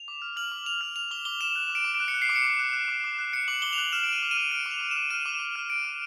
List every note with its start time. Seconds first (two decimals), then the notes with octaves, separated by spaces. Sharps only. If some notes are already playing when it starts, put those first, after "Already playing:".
Already playing: F7
0.08 D6
0.22 F6
0.36 F6 F#7
0.52 D6
0.66 D6 F7
0.81 F6
0.96 F6 F7
1.11 D6 G7
1.25 D6 G7
1.41 F6 E7
1.56 F#6
1.70 D6
1.75 D7
1.85 D6
1.95 D7
2.00 F#6
2.08 C#7
2.14 F#6
2.22 C7
2.29 D6
2.36 C#7
2.45 D6
2.59 F#6
2.73 F#6
2.88 D6
3.04 D6
3.19 F#6
3.33 F#6 C#7
3.48 D6 F#7
3.62 D6 G7
3.73 F7
3.78 F#6 F#7
3.93 F6 E7
4.04 D7
4.07 D6
4.13 D#7
4.22 D6
4.31 D#7
4.37 F6
4.51 F6 D7
4.66 D6
4.71 F7
4.81 D6
4.91 F6 E7
5.10 F6 D#7
5.26 D6
5.40 D6
5.56 F6
5.70 F6 D7
5.85 D6